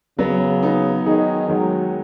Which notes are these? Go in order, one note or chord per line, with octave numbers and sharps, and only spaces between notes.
C#3 F#3 B3
B3 D#4
D#3 D#4 G#4
D#3 F#3 G#3